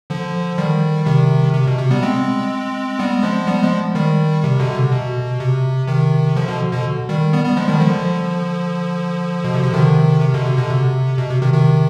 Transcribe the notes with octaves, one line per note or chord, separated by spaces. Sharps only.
D3 F3
D#3 G3
C3 D#3
C3
B2
C3
G3 B3
G#3 C4
G3 B3
F3 G#3
G3 B3
F3 G#3
D#3 G3
C3
B2 D3
C3
B2
C3
C3 D#3
D3 F3
B2 D3
B2 D3
D#3 G3
G3 B3
G3 B3
F3 G#3
D#3 G3
D3 F3
B2
C3
D3
C3 D#3
C3
B2 D3
C3
B2 D3
C3
B2
C3
C3 D#3
C3 D#3